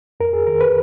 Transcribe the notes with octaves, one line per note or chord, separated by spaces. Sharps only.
F2 A#4
G#4
D#3 A#4
B4